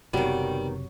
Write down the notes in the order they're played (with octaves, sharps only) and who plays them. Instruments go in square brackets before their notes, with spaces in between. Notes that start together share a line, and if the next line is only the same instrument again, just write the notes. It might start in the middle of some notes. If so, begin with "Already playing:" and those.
[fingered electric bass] F#1 C3 [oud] D#3 B3 [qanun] F#3 [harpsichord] G3